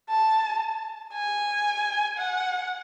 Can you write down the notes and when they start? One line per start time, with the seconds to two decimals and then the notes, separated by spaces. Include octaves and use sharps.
0.10 A5
1.14 G#5
2.18 F#5